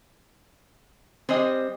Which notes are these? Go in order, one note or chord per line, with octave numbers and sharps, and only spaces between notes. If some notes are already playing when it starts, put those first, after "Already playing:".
G3 G#3 C4 G#4 D#5